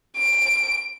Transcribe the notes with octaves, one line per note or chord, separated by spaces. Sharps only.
D7